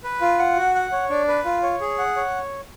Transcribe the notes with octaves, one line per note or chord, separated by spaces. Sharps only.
B4
F4
F#5
F#4
F#5
C#5
D4
B4
F4
C#5
G#4
F#5
C#5